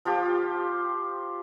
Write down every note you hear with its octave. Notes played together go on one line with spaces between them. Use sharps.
F3 F4 G4